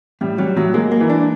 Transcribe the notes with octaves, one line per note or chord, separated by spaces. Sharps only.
A2 G3
F#3 G3
A2 F#3
G#3 A#3
A#3
E3
D4